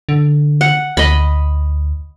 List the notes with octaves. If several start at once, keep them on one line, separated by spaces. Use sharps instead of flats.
D3
F#5
D2 D#5 B5